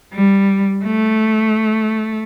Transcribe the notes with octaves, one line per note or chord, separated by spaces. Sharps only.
G3
A3